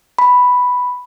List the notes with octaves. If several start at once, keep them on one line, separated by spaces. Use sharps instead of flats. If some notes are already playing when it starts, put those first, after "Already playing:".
B5